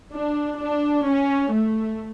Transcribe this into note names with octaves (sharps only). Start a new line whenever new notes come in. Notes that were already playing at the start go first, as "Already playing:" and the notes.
D4
D4
C#4
A3